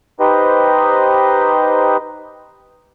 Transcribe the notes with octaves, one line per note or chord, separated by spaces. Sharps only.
D#4 G4 B4 C5 D#5